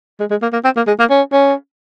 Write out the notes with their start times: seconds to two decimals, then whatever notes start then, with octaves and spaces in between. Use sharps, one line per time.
0.20 G#3
0.31 G#3
0.42 A#3
0.53 A#3
0.64 C4
0.77 A#3
0.87 G#3
0.99 A#3
1.11 C#4
1.33 C#4